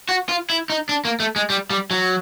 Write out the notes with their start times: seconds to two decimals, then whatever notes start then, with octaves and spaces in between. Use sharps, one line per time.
0.09 F#4
0.29 F4
0.50 E4
0.70 D#4
0.89 D4
1.05 A#3
1.20 A3
1.36 G#3
1.50 G3
1.70 G3
1.91 F#3